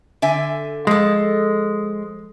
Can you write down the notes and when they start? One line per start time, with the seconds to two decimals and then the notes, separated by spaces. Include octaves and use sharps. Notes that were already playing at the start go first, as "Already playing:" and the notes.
0.22 D3 E5 G#5
0.87 F3 G#3 A4